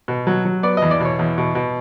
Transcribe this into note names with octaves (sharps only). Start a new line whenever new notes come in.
B2
F#3
F#3
B3 D5
E2 D#5
D5
B2 C#5
E2
B2
B2